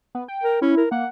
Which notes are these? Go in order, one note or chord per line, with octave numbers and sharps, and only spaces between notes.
B3
G5
A#4
C#4 E4
A#4
A#3 F#5